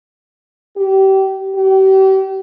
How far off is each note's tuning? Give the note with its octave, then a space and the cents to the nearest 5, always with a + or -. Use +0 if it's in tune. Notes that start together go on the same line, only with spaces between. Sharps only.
G4 -30
G4 -40